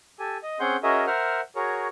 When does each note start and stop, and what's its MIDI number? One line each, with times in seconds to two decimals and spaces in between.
0.19 0.37 67
0.19 0.37 69
0.19 0.37 80
0.43 0.59 75
0.60 0.77 60
0.60 0.77 61
0.60 0.77 68
0.60 0.77 78
0.60 0.77 84
0.60 0.77 91
0.83 1.05 61
0.83 1.05 66
0.83 1.05 68
0.83 1.05 70
0.83 1.05 75
0.83 1.05 76
1.07 1.41 70
1.07 1.41 72
1.07 1.41 76
1.07 1.41 78
1.07 1.41 89
1.56 1.87 66
1.56 1.87 68
1.56 1.87 70
1.56 1.87 73